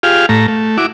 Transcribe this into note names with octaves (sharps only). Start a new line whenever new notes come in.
F4 G4 G#4 F5
A2 A3 A#5
A3
E4 F#4 D6